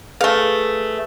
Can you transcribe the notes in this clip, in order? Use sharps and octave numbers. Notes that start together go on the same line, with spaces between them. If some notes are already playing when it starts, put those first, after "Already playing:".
A3 G#4 B4 F5